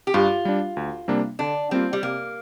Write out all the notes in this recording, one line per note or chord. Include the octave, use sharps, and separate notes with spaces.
G4
G2 F4
G3 D4
D2
C3 G3 A#3 D4
D3 D4
G3 A#3 C4 F4
G3
C3 A#3